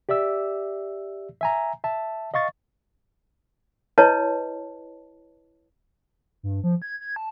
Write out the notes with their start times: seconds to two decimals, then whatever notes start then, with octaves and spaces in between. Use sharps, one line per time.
0.09 G4 D5 E5 E6
1.41 E5 G#5 A#5
1.84 E5 A5
2.34 D#5 F5 C#6 A6
3.98 E4 B4 C#5 D#5 A5
6.43 G2
6.64 F3
6.82 G#6
7.01 G#6
7.16 A5